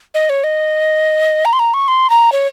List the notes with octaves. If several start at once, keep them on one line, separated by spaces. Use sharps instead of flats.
D#5
C#5
D#5
A#5
C6
A#5
C#6
C6
A#5
C#5